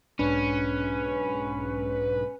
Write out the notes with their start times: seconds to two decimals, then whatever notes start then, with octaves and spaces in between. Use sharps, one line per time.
0.19 B1 G#2 C#4 D4 B4